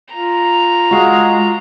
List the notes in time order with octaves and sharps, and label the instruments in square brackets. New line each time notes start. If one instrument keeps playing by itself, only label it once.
[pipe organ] F4 [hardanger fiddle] A#5
[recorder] G#3 [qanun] F#4 F5